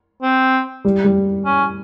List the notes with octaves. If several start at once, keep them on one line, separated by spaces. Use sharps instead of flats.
C4
G3
G3
C#4